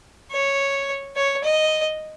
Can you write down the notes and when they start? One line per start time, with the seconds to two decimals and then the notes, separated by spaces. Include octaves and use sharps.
0.32 C#5
1.16 C#5
1.44 D#5